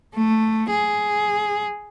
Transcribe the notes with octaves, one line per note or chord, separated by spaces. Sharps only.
A3
G#4